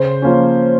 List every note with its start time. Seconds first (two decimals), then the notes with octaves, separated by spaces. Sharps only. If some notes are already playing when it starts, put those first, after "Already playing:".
Already playing: C#3 C5
0.22 F3 A#3 C#4